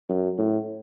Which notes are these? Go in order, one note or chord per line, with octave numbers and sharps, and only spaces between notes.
F#2
A2